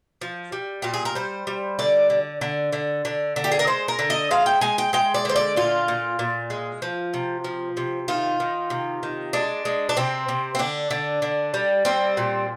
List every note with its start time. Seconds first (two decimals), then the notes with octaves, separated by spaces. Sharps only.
0.21 F3
0.52 G3
0.82 A#2 G4
0.94 G#4
1.05 A#4
1.15 G3 C5
1.47 G3
1.79 D3 D5
2.10 D3
2.41 D3
2.72 D3
3.05 D3
3.36 D3
3.44 G4
3.52 G#4
3.59 A#4
3.67 G#3 C5
3.88 A#4
3.99 D3
4.10 D#5
4.31 G#3 F5
4.46 G5
4.61 G#3 G#5
4.78 G5
4.93 G#3 G5
5.14 D5
5.25 D3 C5
5.36 D5
5.56 A#2 F4
5.88 A#2
6.19 A#2
6.50 G#3
6.82 F3
7.14 C3
7.44 F3
7.77 C3
8.08 D#3 F4
8.40 D#3
8.70 C3
9.03 D#3
9.33 G#3 D4
9.65 G#3
9.89 D4
9.97 C3 C4
10.28 C3
10.55 C4
10.59 D3 D4
10.90 D3
11.22 D3
11.54 G3
11.85 G3 C4
12.17 A#2